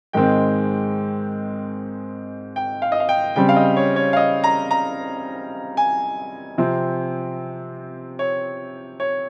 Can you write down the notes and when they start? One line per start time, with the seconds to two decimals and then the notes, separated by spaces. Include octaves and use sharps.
0.13 G#2 D#3 G#3 C4 G5
2.56 G5
2.82 F5
2.92 D#5
3.00 F5
3.09 G5
3.36 C#3 G3 C4 G5
3.49 F5
3.56 D#5
3.77 C#5
3.96 C#5
4.13 F5
4.17 D#5
4.44 A#5
4.71 A#5
5.77 G#5
6.58 C3 F3 C4
8.19 C#5
9.00 C#5